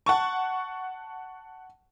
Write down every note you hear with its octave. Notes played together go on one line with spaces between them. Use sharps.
F#5 A5 C#6